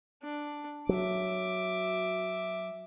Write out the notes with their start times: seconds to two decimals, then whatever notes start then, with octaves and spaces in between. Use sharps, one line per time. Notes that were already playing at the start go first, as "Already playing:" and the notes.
0.23 D4
0.89 F#3 E5 D6